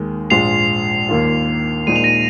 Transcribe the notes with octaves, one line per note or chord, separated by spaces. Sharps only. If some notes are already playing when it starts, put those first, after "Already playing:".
Already playing: D#2 D#3 G#3
A#1 G#2 G#3 F4 C7 F7
D#2 D#3 A#3 F4
A#1 A#2 G#3 D#4 D#7
F7
A#6 D#7